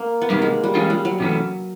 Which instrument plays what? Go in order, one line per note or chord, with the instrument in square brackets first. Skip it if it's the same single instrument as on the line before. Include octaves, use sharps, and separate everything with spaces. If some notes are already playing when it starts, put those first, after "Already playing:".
Already playing: [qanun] A#3
B3
[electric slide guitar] C3 D#3 G3 [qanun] A#3
[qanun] G#3
G3
[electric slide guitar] E3 G#3 C#4 F4
[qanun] G3
F#3
[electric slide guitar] C3 E3 A3 C#4